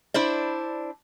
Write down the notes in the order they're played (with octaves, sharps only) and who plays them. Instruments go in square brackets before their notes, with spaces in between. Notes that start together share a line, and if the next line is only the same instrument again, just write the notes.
[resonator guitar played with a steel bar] D4 E4 C5 D5